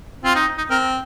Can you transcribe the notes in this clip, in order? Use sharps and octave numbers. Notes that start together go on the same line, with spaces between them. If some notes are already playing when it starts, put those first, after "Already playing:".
C4 F4
D#4
D#4
C4 A#4